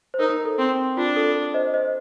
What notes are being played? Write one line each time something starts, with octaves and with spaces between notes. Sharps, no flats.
C5
D#4 A#4
A4
C4
D4 F4
A4
C5 D#5
C5 D#5